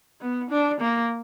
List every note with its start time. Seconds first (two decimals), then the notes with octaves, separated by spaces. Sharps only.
0.21 B3
0.51 D4
0.81 A#3